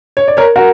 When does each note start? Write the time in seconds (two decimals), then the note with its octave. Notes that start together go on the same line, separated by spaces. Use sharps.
0.17 C#5
0.28 D5
0.37 A#4 C#5
0.56 F#4 A#4